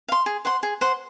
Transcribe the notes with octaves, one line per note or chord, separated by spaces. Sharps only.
F5 C6
G#4
C5 F#5 C6
G#4
C5 F#5 C6